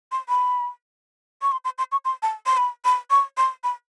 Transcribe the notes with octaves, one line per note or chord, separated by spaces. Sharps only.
C6
B5
C#6
C6
C6
C6
C#6
C6
A5
C6
B5
B5
C#6
C6
B5